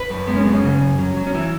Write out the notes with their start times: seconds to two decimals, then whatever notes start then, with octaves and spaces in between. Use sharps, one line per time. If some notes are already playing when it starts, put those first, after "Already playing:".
Already playing: B4
0.10 F#2
0.27 G#3 B3
0.37 C#4
0.45 F#2 B3
0.54 C#4
0.64 C#3
0.81 F#2
0.99 F#3
1.16 F#3
1.27 C#4
1.35 E3 E4